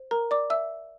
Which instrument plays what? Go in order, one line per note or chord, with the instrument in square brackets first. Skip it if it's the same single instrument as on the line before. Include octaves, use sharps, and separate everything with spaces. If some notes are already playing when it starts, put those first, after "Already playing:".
Already playing: [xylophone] C5
A#4 A#5
D5 D6
E5 E6